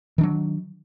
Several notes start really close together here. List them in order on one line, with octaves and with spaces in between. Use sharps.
D#3 D4 F#3